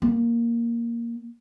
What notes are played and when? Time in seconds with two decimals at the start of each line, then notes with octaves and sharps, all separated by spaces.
0.02 A#3